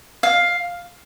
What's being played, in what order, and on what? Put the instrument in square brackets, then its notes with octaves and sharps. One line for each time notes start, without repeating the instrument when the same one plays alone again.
[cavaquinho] F5